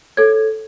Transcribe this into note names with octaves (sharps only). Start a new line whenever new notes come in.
A4 C#5 G#6